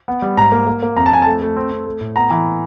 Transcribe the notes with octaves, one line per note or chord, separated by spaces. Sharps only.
B3
G3
G#2 A#5
A#3
A#3
A#3
F2 A#5
A5
F2 G#5
A3 A5
A3
C4
C4
A3
A2
B3 A#5
E3